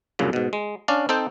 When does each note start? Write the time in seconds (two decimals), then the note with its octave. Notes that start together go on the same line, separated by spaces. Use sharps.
0.19 C2 F#2 A#2 C#3
0.33 G#2 B2
0.53 G#3
0.88 C#4 D4 D5 F5
1.09 C4 D#4 A4 C5 G5